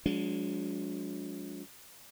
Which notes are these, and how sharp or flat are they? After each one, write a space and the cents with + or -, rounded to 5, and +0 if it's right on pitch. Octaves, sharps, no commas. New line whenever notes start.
F3 +45 G#3 +0 D4 -35